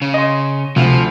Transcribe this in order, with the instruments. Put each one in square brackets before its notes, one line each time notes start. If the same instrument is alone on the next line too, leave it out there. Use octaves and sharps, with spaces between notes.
[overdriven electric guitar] C#3
[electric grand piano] D#5 C6
[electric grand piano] D2 [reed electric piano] C3 [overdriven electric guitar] F3